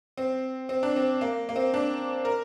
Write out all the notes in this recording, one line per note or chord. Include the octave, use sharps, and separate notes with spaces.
C4
C4
D4
C4
A#3
A#3
C4
D4
A#4